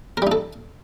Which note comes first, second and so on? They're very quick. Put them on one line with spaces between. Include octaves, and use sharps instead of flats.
A#4 G3 D#4 A4